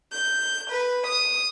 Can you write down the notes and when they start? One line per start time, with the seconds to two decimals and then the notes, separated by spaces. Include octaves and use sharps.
0.12 G6
0.71 B4
1.07 D#6